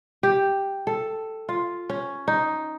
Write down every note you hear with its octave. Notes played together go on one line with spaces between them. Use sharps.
G4
A4
F4
C#4
D#4